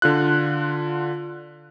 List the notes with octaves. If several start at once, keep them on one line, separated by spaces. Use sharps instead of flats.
D3 F4 F#6